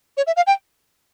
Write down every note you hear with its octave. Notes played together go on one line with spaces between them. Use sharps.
C#5
E5
F5
G5